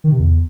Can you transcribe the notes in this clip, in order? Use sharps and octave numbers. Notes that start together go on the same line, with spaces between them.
D#3
C3
E2